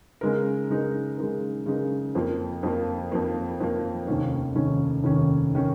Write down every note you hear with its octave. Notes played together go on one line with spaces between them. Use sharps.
C#3 G#3 D#4 A#4
C#3 G#3 D#4 A#4
C#3 G#3 D#4 A#4
C#3 G#3 D#4 A#4
F2 F3 A#3
F2 F3 A#3
F2 F3 A#3
F2 F3 A#3
F1 D#2 D#3 C#4
F1 D#2 D#3 C#4
F1 D#2 D#3 C#4
D#3 C#4